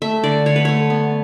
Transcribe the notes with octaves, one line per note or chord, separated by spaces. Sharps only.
A3 E5
D3 D5
D3 C#5
B4
A3 C#5
B3